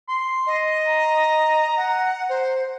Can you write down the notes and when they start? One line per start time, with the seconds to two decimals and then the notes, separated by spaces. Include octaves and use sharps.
0.08 C6
0.46 D#5
0.87 A#5
1.76 F#5
2.29 C5